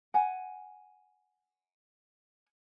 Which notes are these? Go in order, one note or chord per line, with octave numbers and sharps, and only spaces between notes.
F#5 G#5